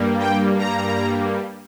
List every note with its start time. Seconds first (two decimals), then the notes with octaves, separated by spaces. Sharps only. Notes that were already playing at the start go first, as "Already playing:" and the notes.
Already playing: G2 G3 A#3
0.19 G5
0.58 A#5